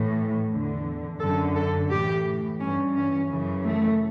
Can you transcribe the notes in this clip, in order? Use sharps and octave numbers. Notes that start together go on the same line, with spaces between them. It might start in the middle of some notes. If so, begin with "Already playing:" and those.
Already playing: A2 E3
E2 D3
F#2 D3 A4
A4
A2 E3 G4
G2 E3 C#4
C#4
F#2 C#3 E3
A3